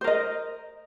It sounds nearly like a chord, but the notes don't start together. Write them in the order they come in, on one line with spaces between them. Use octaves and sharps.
C5 A#4 D#5